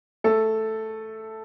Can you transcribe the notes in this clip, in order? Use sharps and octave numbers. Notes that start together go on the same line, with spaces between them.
A3 A4